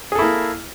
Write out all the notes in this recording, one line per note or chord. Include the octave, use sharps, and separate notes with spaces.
A#3 E4 G#4 A4